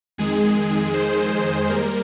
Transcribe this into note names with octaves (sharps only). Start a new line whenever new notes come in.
F2 D#3 G#3 G#4
C5
G3 A#3 A#4